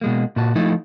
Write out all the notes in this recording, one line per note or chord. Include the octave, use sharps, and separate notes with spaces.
B2 G#3 A#3
A#2 F#4 A5
F3 A3 D#4 E4